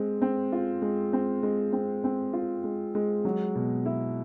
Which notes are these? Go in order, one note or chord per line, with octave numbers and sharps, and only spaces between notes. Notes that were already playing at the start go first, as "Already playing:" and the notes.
Already playing: G#3 C4
C4
F4
G#3
C4
G#3
C4
C4
F4
G#3
G#3
F#3
B2
E4